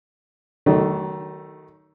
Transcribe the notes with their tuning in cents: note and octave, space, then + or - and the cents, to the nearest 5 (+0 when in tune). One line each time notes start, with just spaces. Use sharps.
D#3 +0 F#3 +35 A3 +0